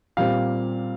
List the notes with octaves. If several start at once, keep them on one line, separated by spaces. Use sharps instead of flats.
A#2 G3 C4 F5